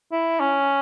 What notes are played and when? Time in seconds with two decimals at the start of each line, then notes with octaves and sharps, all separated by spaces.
0.12 E4
0.40 C#4